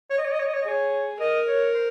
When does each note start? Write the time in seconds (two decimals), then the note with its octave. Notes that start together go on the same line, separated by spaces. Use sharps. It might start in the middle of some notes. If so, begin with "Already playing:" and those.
0.10 C#5
0.18 D#5
0.25 C#5
0.32 D#5
0.40 C#5
0.46 D#5
0.54 C#5
0.62 D#5
0.65 G#4 C#5
1.20 A#4 D#5
1.48 C#5
1.74 C5